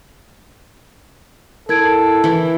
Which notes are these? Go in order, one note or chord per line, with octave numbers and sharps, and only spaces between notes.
E4 A4 A#4 G#6 D7
E3 E4